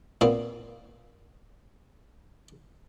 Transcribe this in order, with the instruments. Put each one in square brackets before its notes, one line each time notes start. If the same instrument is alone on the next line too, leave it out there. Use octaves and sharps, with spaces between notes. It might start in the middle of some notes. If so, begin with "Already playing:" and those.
[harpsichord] A#2 B3 C4